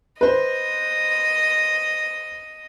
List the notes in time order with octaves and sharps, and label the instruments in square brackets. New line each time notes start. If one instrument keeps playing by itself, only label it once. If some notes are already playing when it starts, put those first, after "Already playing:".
[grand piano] B4 C5 [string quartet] D#5